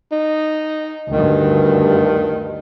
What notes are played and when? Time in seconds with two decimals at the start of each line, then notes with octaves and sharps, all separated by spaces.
0.12 D#4
1.12 D2 G2 D#3